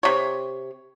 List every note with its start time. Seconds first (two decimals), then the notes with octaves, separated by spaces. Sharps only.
0.03 C3 C#5